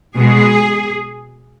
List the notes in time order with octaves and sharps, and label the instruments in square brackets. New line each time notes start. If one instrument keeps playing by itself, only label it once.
[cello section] B2 G#3 G#4